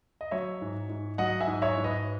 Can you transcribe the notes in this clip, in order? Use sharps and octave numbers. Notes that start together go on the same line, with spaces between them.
D#5
F#3 C#5 E5
G#2
G#2
F#3 D#5 F#5
E5 G#5
G#2
C#5 E5
G#2
B4 D#5